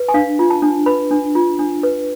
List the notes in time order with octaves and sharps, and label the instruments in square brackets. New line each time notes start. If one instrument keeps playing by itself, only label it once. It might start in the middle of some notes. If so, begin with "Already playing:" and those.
Already playing: [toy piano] B4
G#5
D4 F5
F4
A5
D4
B4 B5
D4
F4
D4
B4